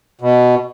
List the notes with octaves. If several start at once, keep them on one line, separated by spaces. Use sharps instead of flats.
B2